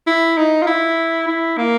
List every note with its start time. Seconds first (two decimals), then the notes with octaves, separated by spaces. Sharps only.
0.07 E4
0.37 D#4
0.62 F4
0.67 E4
1.27 E4
1.57 A#3